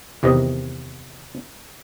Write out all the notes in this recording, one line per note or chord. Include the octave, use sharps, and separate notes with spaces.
E2 C3 D#3 D#5